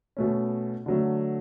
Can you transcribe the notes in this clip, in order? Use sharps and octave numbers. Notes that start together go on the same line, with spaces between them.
B2 A3 C#4
D3 F#3 A3